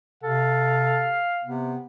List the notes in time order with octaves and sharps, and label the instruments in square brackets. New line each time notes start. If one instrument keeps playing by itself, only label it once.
[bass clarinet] C3 [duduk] A4 [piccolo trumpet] F5
[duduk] C3 [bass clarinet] B3